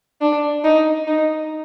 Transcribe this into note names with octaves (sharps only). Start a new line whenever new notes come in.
D4
D#4
D#4